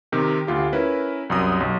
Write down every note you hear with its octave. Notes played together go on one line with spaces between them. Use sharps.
C3 D#3 C4
D2 F4 G4
C#4 E4 A#4 B4
C2 F#2 D#6
B1